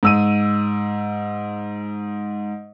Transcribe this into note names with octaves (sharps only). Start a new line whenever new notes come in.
G#2 E6 D#7